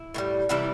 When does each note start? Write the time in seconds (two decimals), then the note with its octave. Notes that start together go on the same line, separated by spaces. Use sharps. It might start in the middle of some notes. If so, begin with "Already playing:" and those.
Already playing: E4
0.14 A2 E3 G3
0.49 C3 E3 G3 E4